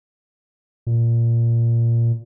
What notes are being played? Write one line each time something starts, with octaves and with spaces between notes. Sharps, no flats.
A#2